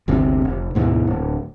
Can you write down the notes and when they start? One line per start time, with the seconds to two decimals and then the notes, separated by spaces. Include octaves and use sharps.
0.08 G1 D2 C3
0.45 F1
0.75 D2 G#2 B2 E3
1.07 D1